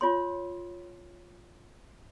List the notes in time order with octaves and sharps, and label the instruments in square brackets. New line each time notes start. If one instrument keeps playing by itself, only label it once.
[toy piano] F4 C#5 C6